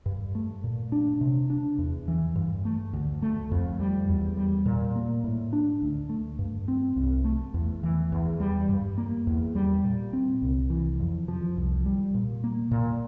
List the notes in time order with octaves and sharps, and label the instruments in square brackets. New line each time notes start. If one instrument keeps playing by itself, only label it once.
[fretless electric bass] G2
A3
A#2
D4
C3
D4
E2
E3
G2
A3
D2
A3
F2
G3
E2
G3
A#2
A#3
A2
D4
D2
A3
G2
C4
C2
A3
E2
E3
E2
G3
G2
A#3
E2
G3
A#2
C4
C2
E3
F2
F3
C2
G3
A#2
A#3
A#2